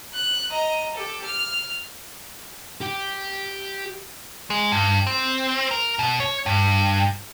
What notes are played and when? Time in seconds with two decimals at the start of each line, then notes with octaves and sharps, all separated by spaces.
0.14 F#6
0.50 D#5 A#5
0.94 G4 A4
1.25 F6
2.81 G4
4.50 G#3
4.72 G2
5.07 C4
5.71 A#4
5.99 B2
6.20 C#5
6.46 G2